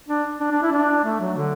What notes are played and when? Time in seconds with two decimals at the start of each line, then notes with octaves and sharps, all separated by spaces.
0.08 D4
0.40 D4
0.52 D4
0.62 E4
0.72 D4
1.05 A3
1.20 F#3
1.37 D3